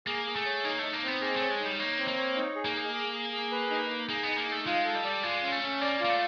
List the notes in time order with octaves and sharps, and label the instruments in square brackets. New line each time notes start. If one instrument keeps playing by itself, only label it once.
[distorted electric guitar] A#3 [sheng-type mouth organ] G#4
[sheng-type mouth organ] G#4
[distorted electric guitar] A3
[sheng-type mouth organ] C#5
[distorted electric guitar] A#3 [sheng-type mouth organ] D#4
[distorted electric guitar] A3 [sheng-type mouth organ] D#4
[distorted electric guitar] A#3
[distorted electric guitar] B3 [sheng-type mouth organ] C4
[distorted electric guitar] A#3 [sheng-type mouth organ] G#4
[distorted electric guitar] A3 [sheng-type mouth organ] C#5
[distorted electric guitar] G#3
[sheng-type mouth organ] D#4
[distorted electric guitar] G3
[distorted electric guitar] A#3 [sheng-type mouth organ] C#5
[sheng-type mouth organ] C4
[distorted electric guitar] A#3
[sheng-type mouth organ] C#5
D#4
G#4
[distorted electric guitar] A#3
[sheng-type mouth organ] G#4
G#4
G#4
G#4
B4
D#4
D#4
[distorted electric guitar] A#3 [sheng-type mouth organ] G#4
[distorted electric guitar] B3 [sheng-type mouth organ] D#4
[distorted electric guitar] A#3
[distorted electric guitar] A3 [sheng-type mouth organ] D#4
[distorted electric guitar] G#3 [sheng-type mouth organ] F4
[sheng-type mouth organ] A4
[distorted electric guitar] G3
[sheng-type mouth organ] D5
[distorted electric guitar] G#3 [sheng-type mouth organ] F4
[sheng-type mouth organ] C#4
[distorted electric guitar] A3
[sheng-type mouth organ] C#4
[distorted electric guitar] A#3 [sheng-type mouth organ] D5
[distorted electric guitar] A#3 [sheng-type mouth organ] F4
[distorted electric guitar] A3